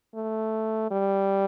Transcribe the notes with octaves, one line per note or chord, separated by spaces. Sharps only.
A3
G3